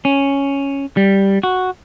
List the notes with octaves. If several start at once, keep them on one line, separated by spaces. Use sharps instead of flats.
C#4
G3
F#4